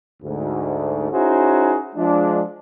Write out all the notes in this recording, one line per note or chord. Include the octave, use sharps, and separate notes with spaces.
D2 G#2
C#4 D#4 E4 F#4 G#4 C5
F3 G#3 D4